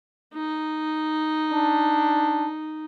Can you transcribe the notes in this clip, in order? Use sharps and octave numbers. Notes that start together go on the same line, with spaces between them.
D#4
D4